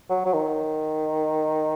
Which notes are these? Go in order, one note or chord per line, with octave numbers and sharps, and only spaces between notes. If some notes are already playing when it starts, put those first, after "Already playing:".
F#3
F#3
D#3